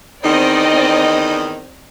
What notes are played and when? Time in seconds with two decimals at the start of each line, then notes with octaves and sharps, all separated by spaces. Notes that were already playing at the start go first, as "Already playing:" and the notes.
0.24 E2 D#3 C4 D#4 D5 D#5